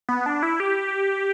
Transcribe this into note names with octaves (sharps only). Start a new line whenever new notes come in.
B3
D4
E4
G4